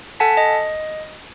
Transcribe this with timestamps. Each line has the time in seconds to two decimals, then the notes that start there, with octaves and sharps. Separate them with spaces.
0.20 A4 F#5 G#5 A5 B6
0.37 D#5